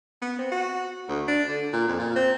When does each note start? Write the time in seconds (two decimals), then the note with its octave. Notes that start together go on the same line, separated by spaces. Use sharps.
0.22 B3
0.39 C4
0.51 F#4
1.09 D2
1.28 D4
1.48 D3
1.73 A#2
1.88 F2
1.99 A#2
2.16 C4